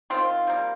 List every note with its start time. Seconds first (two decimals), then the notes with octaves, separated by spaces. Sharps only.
0.10 D#3 C4 F4
0.47 G3 A#3